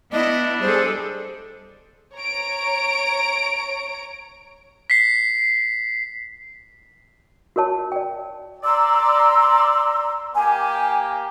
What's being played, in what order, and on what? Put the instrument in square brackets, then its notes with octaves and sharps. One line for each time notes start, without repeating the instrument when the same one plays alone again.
[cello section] B3 E4 [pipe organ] D4 [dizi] D#5
[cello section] G3 G#4 A4 [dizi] C5
[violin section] C#5 A#5 D7
[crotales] B6 C7
[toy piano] F#4 A#4 C#5 A5
D5 G5
[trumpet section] D5 [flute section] A#5 C6 E6
[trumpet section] A#3 G4 [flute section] G#5